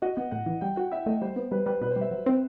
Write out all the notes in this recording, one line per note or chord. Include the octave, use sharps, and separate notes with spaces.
F#4 D#5
B3 F#5
A2 F#5
E3
G3 G5
F#4 F#5
E4 E5
A3 D#5
G3 C5
B3
G3 B4
G3 B4
B2 B4
C5
G3 E5
F#3
C4